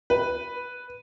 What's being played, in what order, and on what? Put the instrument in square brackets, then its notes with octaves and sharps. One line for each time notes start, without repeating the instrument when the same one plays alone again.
[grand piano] B4